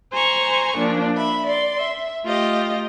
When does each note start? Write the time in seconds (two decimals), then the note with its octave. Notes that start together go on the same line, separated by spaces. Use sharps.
0.12 C5 G#5 A#5 C#6
0.77 A#2 F3 D4
1.16 E5 B5
1.46 D5 C6
1.81 E5
2.24 A3 F4 G4 D#5